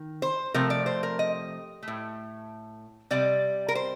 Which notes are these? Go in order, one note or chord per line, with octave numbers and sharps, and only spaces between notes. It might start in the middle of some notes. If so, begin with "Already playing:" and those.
Already playing: D#3
C5
C3 F3 A3 A#4
D5
C5
A#4
D#5
A3
A2
C3 G3 D5
A#4
C5